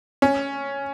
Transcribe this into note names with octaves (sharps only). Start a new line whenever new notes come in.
C#4